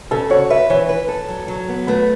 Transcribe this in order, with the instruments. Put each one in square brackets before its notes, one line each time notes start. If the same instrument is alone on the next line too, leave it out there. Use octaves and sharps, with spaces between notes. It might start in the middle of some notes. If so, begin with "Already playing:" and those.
[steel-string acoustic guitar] C#3 [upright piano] A4
[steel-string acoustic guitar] F#4 [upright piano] C#5
[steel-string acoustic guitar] B4 [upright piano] E5
[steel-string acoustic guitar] E3 [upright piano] C#5
[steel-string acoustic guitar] B4
A4
F#3
F#3
B3
[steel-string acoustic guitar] A3 [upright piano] B4